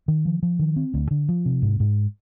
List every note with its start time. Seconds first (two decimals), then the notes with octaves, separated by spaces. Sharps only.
0.08 D#3
0.25 F3
0.43 F3
0.59 D#3
0.76 C4
0.94 D2
1.11 D3
1.29 F3
1.46 C3
1.62 G#2
1.80 G#2